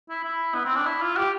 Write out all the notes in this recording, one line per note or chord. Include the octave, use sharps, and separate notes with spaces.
E4
E4
B3
C4
D4
E4
F4
G4